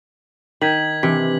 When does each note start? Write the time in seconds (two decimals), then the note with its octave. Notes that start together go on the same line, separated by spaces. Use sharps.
0.61 D#3 G#6 B6 F#7
1.03 C3 E3 D4 B6